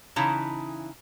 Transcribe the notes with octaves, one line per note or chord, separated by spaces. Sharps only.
C#3 E3 D#4 E4 A5 A#5